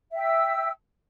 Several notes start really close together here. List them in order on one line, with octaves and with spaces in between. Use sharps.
E5 G5 E6